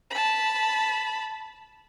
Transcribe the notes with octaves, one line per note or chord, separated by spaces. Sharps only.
A5 B5